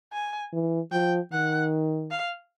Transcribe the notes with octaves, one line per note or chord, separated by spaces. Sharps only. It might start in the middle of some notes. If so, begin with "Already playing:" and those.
G#5
E3
F3 G5
D#3 F#5
F5